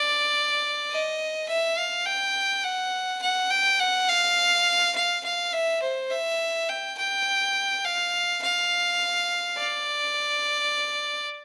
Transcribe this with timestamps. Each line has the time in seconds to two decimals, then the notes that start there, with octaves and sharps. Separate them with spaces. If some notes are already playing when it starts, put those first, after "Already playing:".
Already playing: D5
0.90 D#5
1.48 E5
1.77 F5
2.06 G5
2.64 F#5
3.22 F#5
3.50 G5
3.80 F#5
4.08 F5
4.95 F5
5.24 F5
5.53 E5
5.82 C5
6.11 E5
6.69 G5
6.98 G5
7.84 F5
8.42 F5
9.58 D5